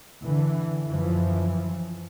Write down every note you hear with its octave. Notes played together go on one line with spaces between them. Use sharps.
D3 E3
F#2 E3 F3